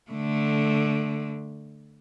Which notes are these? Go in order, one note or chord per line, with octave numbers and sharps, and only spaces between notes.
D3 A3